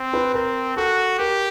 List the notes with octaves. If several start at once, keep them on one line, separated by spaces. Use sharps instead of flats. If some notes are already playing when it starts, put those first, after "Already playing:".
Already playing: C4
B4
C4 A#4
F#4 A4
G4 A#4